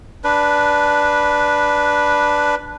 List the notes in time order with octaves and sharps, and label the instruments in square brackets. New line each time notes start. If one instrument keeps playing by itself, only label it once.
[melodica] D4 B4